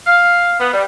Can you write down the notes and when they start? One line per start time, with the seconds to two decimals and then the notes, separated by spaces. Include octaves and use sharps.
0.07 F5
0.60 B3
0.74 G3